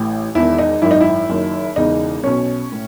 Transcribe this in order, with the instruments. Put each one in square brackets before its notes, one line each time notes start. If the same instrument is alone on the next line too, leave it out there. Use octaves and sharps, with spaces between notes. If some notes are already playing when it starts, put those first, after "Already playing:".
Already playing: [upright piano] A1 A2 E3
E1 E2 D#3 E4
D#4
G#1 F#2 D#3 E4
D#4
E4
F#1 F#2 D#3
E1 E2 C#3 E3 D#4
B1 B2 C#4
A2